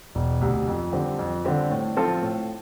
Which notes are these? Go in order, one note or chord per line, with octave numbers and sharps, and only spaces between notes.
E1
D2 C3
F2
D3 G3 C4 G4
F2
D3 G3 C4 G4
A2
F3 C4 F4 A4
A2